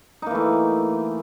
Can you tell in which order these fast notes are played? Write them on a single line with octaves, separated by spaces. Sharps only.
D#4 A#3 E3 A3